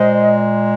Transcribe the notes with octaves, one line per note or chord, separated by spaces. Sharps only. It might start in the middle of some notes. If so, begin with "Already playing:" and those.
Already playing: A#2 G#3 C5 D#5